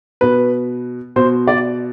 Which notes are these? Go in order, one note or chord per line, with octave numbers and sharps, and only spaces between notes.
B2 B4
B2 C5
D5